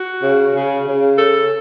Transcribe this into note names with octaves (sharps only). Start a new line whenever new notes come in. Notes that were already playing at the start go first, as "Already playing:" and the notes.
Already playing: F#4
C#3
C#3
C#3
A4